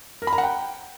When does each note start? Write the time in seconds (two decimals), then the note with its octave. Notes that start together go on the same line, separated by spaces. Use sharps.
0.22 A#4
0.27 B5
0.33 A#5
0.38 F#5
0.43 G5